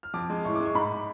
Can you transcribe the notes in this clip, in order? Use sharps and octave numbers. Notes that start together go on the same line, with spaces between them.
F6
F2 D6
G#3
A2 C#6
D6
G#3
C#6
G#2 B5